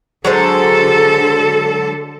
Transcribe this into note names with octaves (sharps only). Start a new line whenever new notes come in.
D3 F#3 G#3 A4 C5